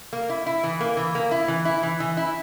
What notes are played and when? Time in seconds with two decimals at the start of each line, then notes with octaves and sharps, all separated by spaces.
0.13 A#3
0.29 E4
0.46 E4
0.64 E3
0.80 A#3
0.97 E3
1.15 A#3
1.31 E4
1.48 E3
1.65 E4
1.83 E3
2.00 E3
2.17 E4